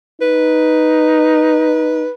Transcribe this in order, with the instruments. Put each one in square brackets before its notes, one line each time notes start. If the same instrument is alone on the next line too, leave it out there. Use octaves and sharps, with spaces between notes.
[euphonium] D#4 [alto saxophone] B4